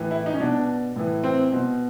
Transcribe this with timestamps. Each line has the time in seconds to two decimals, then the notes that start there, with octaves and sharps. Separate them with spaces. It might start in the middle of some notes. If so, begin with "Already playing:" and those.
Already playing: A2 E3
0.11 E4
0.26 D#4
0.34 C#4
0.40 B2 D4
0.96 A2 E3
1.23 C4
1.53 B2